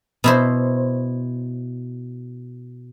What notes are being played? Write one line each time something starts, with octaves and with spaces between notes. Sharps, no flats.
B2 E4 C5